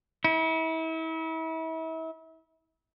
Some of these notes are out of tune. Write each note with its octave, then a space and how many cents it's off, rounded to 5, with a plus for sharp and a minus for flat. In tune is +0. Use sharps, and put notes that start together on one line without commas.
E4 -35